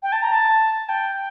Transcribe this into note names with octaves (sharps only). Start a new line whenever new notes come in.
G5
A5
A#5
A5
G5